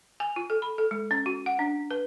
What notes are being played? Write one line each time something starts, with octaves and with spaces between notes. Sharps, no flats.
G#5
F4
A4
B5
A4
G#3
C#4
F#4
F#5
D4
B4